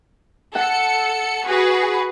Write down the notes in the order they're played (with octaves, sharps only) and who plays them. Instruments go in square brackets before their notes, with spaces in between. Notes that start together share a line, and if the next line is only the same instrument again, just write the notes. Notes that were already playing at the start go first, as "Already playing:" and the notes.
[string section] A4 C#7 [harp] F#5
[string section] F#4 G#4 B4